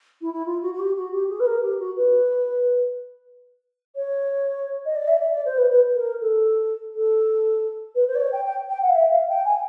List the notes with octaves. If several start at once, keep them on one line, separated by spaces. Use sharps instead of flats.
E4
E4
F4
F#4
F#4
G4
F#4
G4
G#4
B4
A#4
G4
F#4
B4
C#5
D#5
D5
E5
D5
D5
C5
B4
B4
A#4
A4
A4
B4
C5
D5
C#5
G5
G5
G5
F#5
F5
E5
F5
G5
G#5